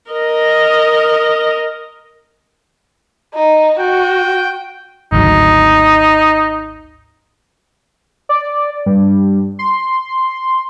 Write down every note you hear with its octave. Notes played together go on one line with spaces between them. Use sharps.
A#4 D#5
D#4
F#4 G5
G#1 D2 F#3 D#4
D5
G2
C6